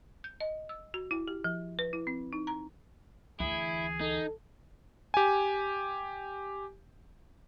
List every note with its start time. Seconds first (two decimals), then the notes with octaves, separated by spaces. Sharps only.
0.24 G6
0.40 D#5
0.69 E6
0.94 F#4
1.11 E4
1.28 G4
1.44 F3
1.79 B4
1.93 E4
2.07 C4
2.33 D#4
2.47 A#5
3.40 D2 E3 E4 G#4
4.01 D#4 A4
5.14 G4 G#5